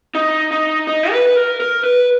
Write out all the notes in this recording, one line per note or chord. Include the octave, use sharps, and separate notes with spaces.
D#4
D#4
D#4
B4
A#4
A#4
B4